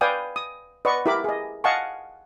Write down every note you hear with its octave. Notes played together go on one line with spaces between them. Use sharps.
B4 D5 F5 G5 G#5 D#6
D#6
B4 D5 D#5 F#5 C#6
E4 G4 A#4 B5 D6
G#4 D#5
D#5 F5 F#5 G#5 A5 C#6